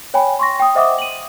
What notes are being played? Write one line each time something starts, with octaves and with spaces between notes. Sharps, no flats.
C#5 G5 G#5 B5
C6 C#6 A#6
G5 D#6
C5 D#5 E5 F#5 D6 D#6
D#7 F#7